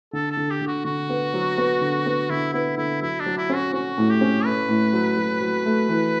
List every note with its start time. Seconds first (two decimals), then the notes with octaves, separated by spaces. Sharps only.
0.13 D3 A4
0.31 A4
0.37 D3
0.50 G4
0.61 D3
0.67 F#4
0.85 D3 F#4
1.09 B3
1.34 F#3
1.58 B3
1.81 D3
2.06 B3
2.29 D3 E4
2.53 B3 E4
2.77 D3 E4
3.02 F#3 E4
3.20 D4
3.26 F#3
3.37 E4
3.50 C#4
3.55 F#4
3.73 C#4 F#4
3.98 A2
4.10 G4
4.21 C#4
4.45 A3 B4
4.69 A2
4.93 F#3
5.17 F#3
5.41 F#3
5.65 A3
5.89 E3